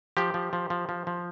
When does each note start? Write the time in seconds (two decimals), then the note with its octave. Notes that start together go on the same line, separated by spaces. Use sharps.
0.17 F3 G4
0.34 F3
0.53 F3
0.70 F3
0.89 F3
1.07 F3